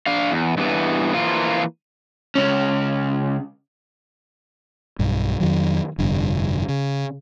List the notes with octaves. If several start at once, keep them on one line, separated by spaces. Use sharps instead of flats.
D4 F5
E2
G2 E3 B3
E3 F3 A#3 F4
C#2 C#4
B1 G2
F2 D#3 F#3
F1 G2 D3
C#3